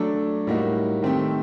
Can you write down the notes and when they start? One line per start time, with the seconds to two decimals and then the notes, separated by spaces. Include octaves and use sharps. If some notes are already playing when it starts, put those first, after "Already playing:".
Already playing: F#3 A3 D4 A4
0.47 A2 G3 A#3 D#4 F#4
1.02 D#3 A3 C4 G4